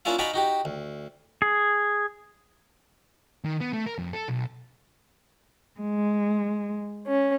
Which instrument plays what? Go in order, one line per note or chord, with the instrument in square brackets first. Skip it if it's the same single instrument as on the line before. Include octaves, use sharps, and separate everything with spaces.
[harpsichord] A#3 C#4 D4 E4 F4 F5
D#4 F#4 D5 F5 G#5 B5
D#4 F#4 G4
D2
[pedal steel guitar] G#4
[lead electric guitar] D#3
B3
A3
A#4
F2
A4
B1
[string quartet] G#3
C#4